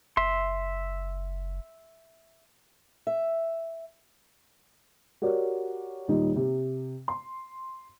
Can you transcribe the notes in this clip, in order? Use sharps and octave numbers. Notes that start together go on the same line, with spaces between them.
F#1 E5 C6
E5
F#4 G4 A#4 C#5 D5
D#1 G3 D#4
C3
C6